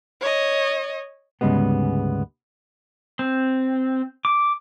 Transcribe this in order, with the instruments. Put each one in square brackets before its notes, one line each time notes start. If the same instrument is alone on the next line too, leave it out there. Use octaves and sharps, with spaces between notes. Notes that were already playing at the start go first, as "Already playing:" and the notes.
[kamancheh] C#5 D#5
[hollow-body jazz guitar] D2 G#2 C#3 G3 G#3 B3
[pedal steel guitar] C4
D6